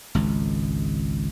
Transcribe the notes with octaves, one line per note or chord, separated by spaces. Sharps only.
G#1 C#2